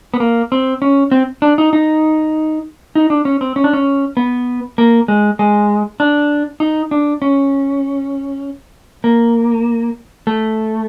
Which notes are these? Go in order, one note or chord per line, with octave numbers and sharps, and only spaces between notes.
B3
A#3
C4
C#4
C4
D4
D#4
D#4
D#4
D4
C#4
C4
C#4
D4
C#4
B3
A#3
G#3
G#3
D4
D#4
D4
C#4
A#3
A3